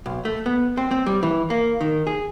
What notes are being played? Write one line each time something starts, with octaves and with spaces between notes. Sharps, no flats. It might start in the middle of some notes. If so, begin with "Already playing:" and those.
B1
A3
B3
C4
C4
G3
E3
A#3
D#3
G#4